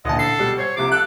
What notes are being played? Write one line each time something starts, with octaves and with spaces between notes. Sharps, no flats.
A1 D2 A#2 D3 D#5 A5
A4 C7
B2 G3
C5 C#5 G#6
C2 C3 F3 D6
A4 F5 F#6